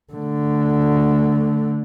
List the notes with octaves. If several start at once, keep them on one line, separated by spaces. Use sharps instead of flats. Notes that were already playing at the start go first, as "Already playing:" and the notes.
D3 A3